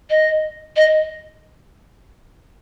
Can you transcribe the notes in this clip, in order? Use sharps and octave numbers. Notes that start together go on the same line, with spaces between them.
D#5
D#5